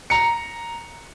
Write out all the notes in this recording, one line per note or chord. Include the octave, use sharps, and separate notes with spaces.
A#5 C#7